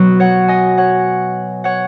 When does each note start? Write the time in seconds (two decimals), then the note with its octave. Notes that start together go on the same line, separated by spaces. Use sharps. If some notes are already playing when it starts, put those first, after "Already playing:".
Already playing: B2 F#3 B3 F#4
0.20 C#5 F#5
0.48 D#5 G#5
0.77 C#5 F#5
1.64 C#5 F#5